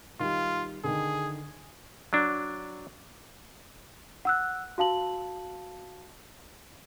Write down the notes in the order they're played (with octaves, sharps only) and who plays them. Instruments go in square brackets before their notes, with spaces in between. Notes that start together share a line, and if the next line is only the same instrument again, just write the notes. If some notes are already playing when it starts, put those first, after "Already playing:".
[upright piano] D#3 G3 [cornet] F4
[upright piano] D3 D#3 [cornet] G#4
[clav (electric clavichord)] F#3 D4
[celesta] F#5 E6 F#6
F#4 F5 A5 F#7